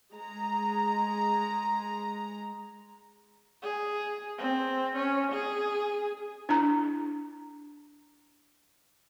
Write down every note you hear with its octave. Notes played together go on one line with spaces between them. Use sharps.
G#3 A#5
G#4
C4
C#4
G#4
D4 E4 A#5